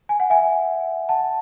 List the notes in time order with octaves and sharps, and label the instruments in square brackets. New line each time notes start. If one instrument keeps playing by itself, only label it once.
[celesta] G#5
F#5
E5 G#5
F#5 A5